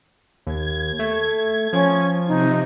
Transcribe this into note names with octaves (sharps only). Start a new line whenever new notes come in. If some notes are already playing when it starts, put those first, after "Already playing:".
D#2 G#6
A3
F3 C#4
C3 D#4